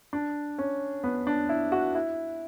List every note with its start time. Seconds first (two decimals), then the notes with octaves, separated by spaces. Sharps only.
0.13 D4
0.58 C#4
1.04 B3
1.27 D4
1.49 E4
1.72 F#4
1.95 E4